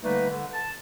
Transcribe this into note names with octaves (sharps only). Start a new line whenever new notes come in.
D3 G3 A3 A#3 D#4 B4
D3
A5